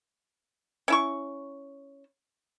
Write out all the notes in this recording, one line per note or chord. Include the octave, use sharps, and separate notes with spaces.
C#4 E4 C#6